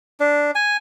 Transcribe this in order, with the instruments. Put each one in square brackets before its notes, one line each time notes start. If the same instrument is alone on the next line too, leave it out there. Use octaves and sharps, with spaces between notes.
[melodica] D4
G#5